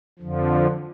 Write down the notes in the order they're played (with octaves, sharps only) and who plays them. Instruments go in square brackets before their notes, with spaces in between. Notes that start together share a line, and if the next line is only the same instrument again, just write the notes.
[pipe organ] F2 D3 F3